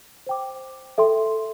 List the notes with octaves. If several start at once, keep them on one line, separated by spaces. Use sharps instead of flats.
C5 G5 D6
A4 E5 G5 C6